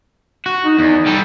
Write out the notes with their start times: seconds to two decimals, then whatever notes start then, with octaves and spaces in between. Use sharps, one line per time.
0.46 F#4
0.65 D#4
0.78 E2 D#4
1.06 G3 A4